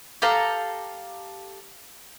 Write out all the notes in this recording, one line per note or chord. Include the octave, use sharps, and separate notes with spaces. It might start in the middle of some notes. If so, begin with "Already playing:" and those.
G4 A4 F5 A#5